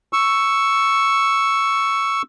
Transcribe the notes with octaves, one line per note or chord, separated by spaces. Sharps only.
C#6 E6